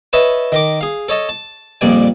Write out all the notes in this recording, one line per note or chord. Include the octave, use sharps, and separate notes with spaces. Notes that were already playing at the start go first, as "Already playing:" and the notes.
B4 C#5 D#5 E5 A5
D#3 A#4 D6
G#4 F5
A4 C#5 D#5 A5
A5
A#1 F2 A#2 G3 D5 G#5